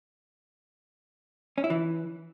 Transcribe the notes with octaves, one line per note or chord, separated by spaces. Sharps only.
C#4
E4
E3